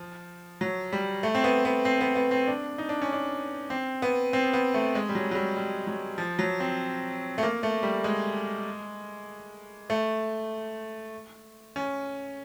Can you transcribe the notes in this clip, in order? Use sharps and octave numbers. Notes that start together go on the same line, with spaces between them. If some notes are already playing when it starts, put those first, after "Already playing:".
Already playing: F3
F#3
G3
A3
C4
B3
B3
C4
B3
B3
C4
D4
D#4
D4
C#4
D4
C4
B3
C4
B3
A3
G#3
G3
F#3
F#3
G3
G3
F#3
F3
F#3
C4
A3
A#3
A3
G3
G#3
A3
C#4